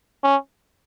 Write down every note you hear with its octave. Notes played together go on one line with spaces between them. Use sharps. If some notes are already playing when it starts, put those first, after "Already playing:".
C#4